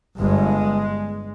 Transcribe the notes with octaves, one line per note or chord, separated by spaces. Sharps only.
G1 G2 G#3